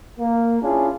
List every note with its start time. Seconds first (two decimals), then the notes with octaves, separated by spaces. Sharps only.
0.19 A#3
0.62 C#4 D4 E4 F4 G#4